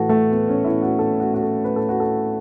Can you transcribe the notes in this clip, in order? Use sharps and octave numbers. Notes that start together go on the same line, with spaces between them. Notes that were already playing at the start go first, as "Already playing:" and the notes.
Already playing: A2 E3 F#4 A4
A3
B3
C#4
E4
F#4
A4
F#4
F#4
A4
B4
A4
F#4
A4